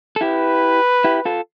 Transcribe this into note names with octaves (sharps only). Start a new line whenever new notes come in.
A4
E4 G4 B4
E4 G4
F4 A4